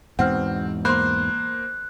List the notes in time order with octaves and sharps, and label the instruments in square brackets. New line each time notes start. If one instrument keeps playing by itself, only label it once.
[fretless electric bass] E2 G#2 B2 [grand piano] C4 [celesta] F#5 F6
[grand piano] A#3 C5 [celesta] B5 C6 [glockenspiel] F#6